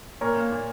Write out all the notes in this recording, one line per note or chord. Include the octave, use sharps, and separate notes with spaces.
A#2 A#4 C#5
A#3
A#2